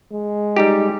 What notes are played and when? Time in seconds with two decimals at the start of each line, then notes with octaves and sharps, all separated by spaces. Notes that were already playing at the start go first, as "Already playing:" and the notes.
0.11 G#3
0.56 G3 D#4 G4